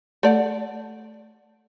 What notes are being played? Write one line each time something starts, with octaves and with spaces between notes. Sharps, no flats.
A3 D5 F#5